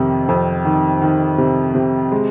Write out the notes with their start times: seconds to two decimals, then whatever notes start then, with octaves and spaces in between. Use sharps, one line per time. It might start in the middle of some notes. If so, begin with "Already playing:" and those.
Already playing: F2 C3 D#3
0.29 F2
0.65 D#3
1.02 D#3
1.38 C3
1.75 C3
2.12 G#3